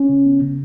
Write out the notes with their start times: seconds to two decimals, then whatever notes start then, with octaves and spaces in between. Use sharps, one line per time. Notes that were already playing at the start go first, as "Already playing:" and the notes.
Already playing: C#4
0.09 C#3
0.26 B3
0.42 C#3